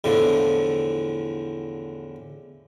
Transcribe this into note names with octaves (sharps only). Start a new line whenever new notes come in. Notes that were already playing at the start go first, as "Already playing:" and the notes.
E2 A2 D3 F3